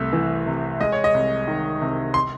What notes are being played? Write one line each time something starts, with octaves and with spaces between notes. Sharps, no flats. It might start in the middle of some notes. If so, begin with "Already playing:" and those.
Already playing: C2 A3 E5
E3
C3
G#3 D#5
C#5
D#5
C2
D#3
C3
C6